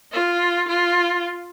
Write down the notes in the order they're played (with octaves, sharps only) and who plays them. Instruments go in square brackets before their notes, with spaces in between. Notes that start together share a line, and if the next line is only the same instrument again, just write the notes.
[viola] F4
F4